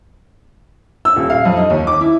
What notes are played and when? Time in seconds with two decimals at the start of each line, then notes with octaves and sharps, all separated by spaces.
1.05 E6
1.16 D#1
1.30 F5
1.45 F2
1.57 D#4
1.70 D#2
1.87 D6
2.01 E4